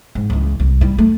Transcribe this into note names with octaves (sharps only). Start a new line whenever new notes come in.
G#2
C#2 E3
C2
G3 E4
A3